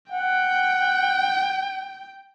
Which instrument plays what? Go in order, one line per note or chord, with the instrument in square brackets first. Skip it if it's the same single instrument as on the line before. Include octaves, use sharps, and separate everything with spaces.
[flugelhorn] F#5 [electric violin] G5